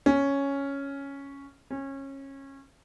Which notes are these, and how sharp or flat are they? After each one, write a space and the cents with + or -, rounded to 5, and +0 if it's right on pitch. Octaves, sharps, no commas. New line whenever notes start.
C#4 +0
C#4 -25